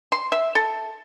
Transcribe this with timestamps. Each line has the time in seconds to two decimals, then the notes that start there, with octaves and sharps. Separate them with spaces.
0.12 C6
0.32 E5
0.55 A4